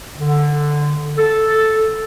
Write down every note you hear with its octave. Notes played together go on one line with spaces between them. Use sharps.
D3
A4